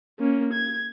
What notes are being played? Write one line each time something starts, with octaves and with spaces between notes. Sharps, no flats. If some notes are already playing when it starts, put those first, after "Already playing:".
A#3 C#4
G#6